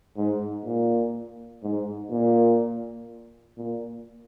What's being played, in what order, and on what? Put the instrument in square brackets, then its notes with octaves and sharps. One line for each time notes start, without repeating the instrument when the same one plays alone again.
[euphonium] G#2
A#2
G#2
A#2
A#2